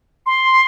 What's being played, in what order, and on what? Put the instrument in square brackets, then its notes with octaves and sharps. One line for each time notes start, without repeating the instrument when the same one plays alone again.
[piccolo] C6